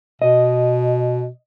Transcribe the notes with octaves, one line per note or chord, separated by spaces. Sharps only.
B2 D#5